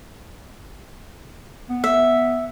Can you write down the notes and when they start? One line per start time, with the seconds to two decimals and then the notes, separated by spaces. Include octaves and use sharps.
1.70 B3
1.84 E5